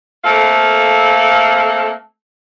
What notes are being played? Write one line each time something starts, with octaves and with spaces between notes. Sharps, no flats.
A3 A#3 C4 A4 F5